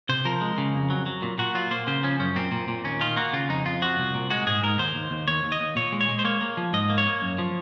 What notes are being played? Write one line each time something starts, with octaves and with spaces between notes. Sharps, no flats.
C3 C5
F3 A#4
G#3
C#3
F2
F#3
F#3
A#2
A#2 F#4
F#3 F4
A#3 C5
C#3 C5
F3 C#4
F#2 C#4
A#2 C4
A#2
A#2
D#2 C#4
D#3 F4
A#3 F#4
C#3 F4
F2 D#4
F2 F4
F3 F#4
C2
A#2
G#3 F#4
G#2 G#4
G#2 A#4
D#2 C5
D#2
D#2
D#2 C#5
D#2
D#5
D#2
A#2 C#5
G#3
C#5
G#3
C5
A#3 C#5
A#3
F3
G#2 D#5
A#3
C#5
A#3
F#2
F3